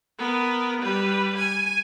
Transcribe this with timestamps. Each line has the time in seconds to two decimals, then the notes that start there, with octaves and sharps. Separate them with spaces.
0.19 B3 A#4
0.82 G3 B4
1.38 G#5